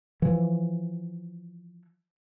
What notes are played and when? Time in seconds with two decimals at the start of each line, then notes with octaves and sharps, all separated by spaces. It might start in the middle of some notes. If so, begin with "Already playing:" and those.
0.22 E3 F3